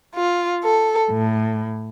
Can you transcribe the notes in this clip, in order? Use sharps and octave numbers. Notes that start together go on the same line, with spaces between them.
F4
A4
A2